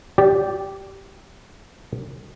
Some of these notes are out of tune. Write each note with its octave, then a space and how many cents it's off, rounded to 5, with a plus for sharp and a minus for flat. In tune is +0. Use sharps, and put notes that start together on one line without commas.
G4 -5 D5 -5